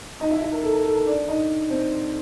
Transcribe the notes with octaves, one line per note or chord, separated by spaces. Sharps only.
D#4 D#5
E4 E5
E4 E5
A#4
A4
A#4
A4
A#4
D4 D5
D#4 D#5
C4 C5